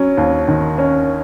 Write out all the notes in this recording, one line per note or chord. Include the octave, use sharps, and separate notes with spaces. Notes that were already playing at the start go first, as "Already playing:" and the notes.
Already playing: F#3 C#4
D#2
D#3
C#4